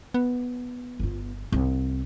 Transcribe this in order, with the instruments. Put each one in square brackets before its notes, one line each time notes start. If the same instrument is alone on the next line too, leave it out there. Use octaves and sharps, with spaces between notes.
[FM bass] B3
[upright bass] G1 F4
C2